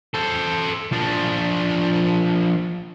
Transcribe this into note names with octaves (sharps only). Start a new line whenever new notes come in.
A4 C5
F3 D4